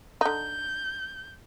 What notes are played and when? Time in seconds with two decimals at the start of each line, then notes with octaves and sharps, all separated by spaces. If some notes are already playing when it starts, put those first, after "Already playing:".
0.21 D3 D#4 G6